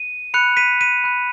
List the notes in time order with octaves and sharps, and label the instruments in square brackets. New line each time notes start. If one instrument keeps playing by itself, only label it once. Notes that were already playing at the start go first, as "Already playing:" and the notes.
Already playing: [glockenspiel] D#7
B5 F#6 C#7 F7
B6 D#7
B6 D#7
B5 F#6